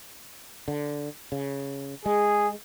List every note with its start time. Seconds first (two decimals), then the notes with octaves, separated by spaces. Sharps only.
0.68 D3
1.32 C#3
2.06 G#3 G#4